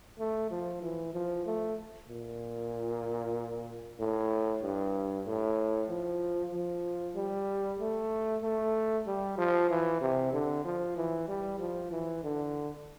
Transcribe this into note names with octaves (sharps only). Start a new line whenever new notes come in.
A3
F3
E3
F3
A3
A#2
A2
G2
A2
F3
F3
G3
A3
A3
G3
F3
E3
C3
D3
F3
E3
G3
F3
E3
D3